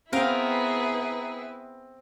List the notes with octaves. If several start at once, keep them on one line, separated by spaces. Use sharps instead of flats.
B3 C4 E4 G#4 A#4 B4 F5 G5